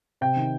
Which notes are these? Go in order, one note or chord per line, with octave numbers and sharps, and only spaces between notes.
C3 G5
D#3